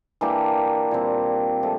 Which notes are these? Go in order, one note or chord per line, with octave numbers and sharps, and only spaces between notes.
E3 A#3 D4 G4
A#2 G3 C4
F3 A3